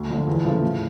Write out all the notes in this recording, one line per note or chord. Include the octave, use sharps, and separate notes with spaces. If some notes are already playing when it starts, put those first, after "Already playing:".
Already playing: D2
D3 F3
E2
C#3 F3 A3
A2